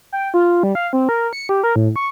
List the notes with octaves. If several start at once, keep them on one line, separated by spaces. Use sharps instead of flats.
G5
F4
G3
F5
C4
A#4
C#7
G4
A#4
A2
C#6